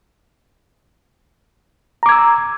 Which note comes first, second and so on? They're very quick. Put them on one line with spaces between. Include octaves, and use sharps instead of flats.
A#5 D6 G#6 E6